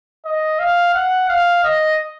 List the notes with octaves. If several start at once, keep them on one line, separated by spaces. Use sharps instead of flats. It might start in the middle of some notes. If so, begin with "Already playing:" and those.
D#5
F5
F#5
F5
D#5